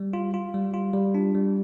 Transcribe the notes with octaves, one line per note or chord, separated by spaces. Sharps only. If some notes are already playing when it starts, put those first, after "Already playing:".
Already playing: G3
F4
F4
G3
F4
G3
D4
G3